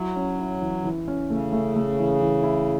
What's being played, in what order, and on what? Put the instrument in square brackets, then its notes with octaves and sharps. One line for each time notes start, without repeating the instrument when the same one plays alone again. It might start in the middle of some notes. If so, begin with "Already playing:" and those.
Already playing: [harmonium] F#3 [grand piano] E4
[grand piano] C#4
E4
E3
E3
C#4
[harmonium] C#3 [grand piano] A3
[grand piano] A3
A3
E3
E3
E4